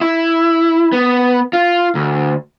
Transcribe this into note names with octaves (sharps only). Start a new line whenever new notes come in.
E4
B3
F4
D2